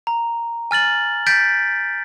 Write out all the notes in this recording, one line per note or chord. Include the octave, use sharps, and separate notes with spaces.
A#5
G#5 F6 A6 F#7
G6 A6 B6 D7